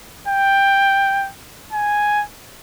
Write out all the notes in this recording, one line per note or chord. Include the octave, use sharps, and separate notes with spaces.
G5
G#5